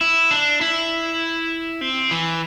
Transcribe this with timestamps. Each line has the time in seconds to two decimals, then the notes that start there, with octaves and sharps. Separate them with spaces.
0.01 E4
0.31 D4
0.61 E4
1.81 C4
2.11 E3